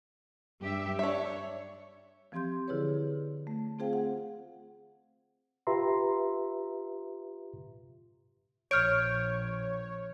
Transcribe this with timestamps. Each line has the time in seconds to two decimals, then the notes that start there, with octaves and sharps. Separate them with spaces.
0.60 G2 G4 E5
0.99 D4 C#5 E5
2.32 E3 F3 C4 G4 C6 G6
2.68 D3 E4 G#4 B4 C#5
3.47 A3
3.79 C4 F4 G#4 C5 F5 G5
3.93 F#5
5.67 F4 G4 B4 E5 A#5 C6
8.71 A#1 C#5 F6 G6 D7